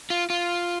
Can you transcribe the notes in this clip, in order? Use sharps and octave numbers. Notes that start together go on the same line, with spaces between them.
F4
F4